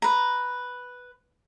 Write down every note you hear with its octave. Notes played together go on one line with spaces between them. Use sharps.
B4 A#5